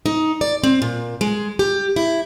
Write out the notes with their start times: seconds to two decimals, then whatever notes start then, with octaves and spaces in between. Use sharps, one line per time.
0.06 D#4
0.41 D5
0.64 C4
0.82 A#2
1.21 G#3
1.59 G4
1.96 E4